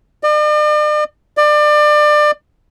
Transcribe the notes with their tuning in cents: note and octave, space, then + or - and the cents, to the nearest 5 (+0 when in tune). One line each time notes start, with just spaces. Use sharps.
D5 +45
D5 +30